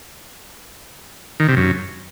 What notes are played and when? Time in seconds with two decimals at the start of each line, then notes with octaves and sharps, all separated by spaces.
1.40 D#3
1.48 C3
1.57 F#2